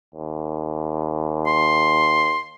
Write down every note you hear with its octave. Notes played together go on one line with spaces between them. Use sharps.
D#2
C6